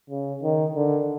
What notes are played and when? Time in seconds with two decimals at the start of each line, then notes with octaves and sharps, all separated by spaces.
0.10 C#3
0.43 D#3
0.76 D3